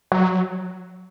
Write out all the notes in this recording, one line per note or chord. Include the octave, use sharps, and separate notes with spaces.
F#3